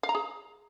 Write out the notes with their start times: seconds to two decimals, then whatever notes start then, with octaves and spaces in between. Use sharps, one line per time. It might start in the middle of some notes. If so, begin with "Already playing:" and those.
0.03 F5
0.09 A#5
0.15 G#4